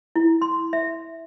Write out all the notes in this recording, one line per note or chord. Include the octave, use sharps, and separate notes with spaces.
E4
C6
E5